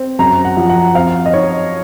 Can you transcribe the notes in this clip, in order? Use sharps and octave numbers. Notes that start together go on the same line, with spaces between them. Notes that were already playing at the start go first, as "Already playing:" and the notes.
Already playing: C4
F#2 A#5
F#5
F3
F#5
C4 F5
D#5
D#4 C#5